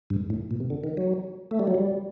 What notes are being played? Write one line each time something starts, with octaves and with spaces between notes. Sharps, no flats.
G2
A2
A#2
C3
D3
D#3
F#3
A3
G3
F#3
G3